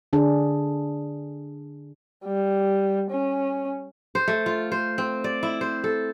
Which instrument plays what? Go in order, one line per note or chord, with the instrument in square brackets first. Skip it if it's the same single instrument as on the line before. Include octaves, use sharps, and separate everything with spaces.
[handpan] D3 D4 G#4
[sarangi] G3
C#4
[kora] C5
A3
F4
C5
C4
D5
E4
C5
A4